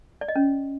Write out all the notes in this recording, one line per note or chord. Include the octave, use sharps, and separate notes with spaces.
D5
D#5
C#4